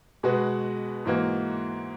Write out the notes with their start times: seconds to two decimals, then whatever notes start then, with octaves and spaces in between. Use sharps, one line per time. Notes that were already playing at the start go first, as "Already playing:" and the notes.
0.23 B2 G#3 B3 F#4
1.05 G#2 E3 A#3 D#4 F#4